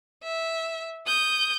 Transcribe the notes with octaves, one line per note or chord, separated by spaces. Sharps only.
E5
D#6 G6